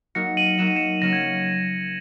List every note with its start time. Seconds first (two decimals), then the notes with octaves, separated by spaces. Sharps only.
0.15 F#3 A#3 D#4 F#4 A#4 A#6 C#7
0.37 D#7 F#7
0.58 F#3 A#3 D#4 F#4 A#4 E7
0.67 D#7
0.76 C#7 E7
1.01 C#3 F#3 A#3 C#4 F#4 A#6
1.13 G#6